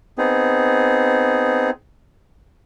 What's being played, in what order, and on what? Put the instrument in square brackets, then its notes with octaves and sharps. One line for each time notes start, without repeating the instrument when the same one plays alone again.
[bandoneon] B3 C4 D#4 G#4